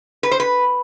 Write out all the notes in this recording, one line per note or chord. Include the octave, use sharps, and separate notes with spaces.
B4
C5
B4